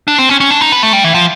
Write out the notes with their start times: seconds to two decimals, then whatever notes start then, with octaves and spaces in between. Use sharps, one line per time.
0.08 D4
0.18 C4
0.29 C#4
0.40 C#4
0.51 D4
0.61 D#4
0.72 B3
0.83 A3
0.93 G3
1.04 E3
1.14 F3